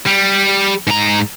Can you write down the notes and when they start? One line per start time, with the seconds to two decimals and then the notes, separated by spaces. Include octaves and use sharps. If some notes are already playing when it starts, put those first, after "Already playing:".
0.06 G3
0.87 G#2 A#5